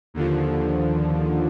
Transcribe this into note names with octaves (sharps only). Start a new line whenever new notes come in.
D#2 D3 F3